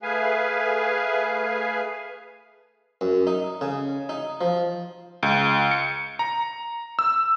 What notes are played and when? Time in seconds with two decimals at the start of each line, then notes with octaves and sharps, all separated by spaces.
0.02 A3 G#4 B4 F5 G#5
3.01 F#2
3.27 D#4
3.61 C#3
4.09 D#4
4.41 F3
5.23 C#2
5.71 C#7
6.19 A#5
6.99 E6